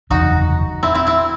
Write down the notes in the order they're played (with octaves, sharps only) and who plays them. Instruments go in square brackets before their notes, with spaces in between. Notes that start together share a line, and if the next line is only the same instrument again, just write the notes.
[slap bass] F#1 E2 C3 E3 [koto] D#4 F#4
[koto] C4 E4
C4 E4
C4 E4